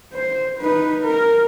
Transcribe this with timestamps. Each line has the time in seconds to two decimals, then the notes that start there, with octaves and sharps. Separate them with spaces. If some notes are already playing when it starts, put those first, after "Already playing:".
0.13 C5
0.58 D#4 B4
1.03 A#4